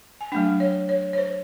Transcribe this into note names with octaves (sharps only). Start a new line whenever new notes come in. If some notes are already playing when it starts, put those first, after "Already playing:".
G#5
F#3 A3 D4 G5
C#5
C#5
C#5
C5